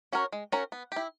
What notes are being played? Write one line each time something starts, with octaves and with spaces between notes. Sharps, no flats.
C#4 F#4 A#4 C#5
G#3
C#4 F#4 A#4 C#5
B3
E4 G4